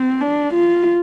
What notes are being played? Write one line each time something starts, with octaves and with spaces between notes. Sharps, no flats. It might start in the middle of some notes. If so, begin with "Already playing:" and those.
Already playing: C4
D4
F4